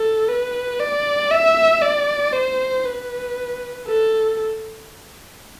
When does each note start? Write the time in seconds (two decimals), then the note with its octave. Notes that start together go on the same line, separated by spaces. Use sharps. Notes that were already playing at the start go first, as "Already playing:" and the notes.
Already playing: A4
0.29 B4
0.80 D5
1.31 E5
1.82 D5
2.33 C5
2.85 B4
3.87 A4